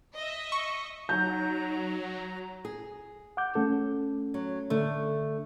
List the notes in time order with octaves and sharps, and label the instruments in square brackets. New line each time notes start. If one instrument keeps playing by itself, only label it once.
[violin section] D#5 E5
[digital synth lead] C#6
[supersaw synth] F#3 [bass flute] D#4 [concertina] A#5 [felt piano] G6
[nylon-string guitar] G#4
[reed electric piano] F#5 D6 G6
A3 C#4 A4
[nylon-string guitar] F#3
[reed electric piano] D3 [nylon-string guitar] A3 D4